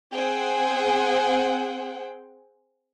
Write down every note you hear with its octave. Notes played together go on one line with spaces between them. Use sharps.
C4 G#4 C5 F#5 G5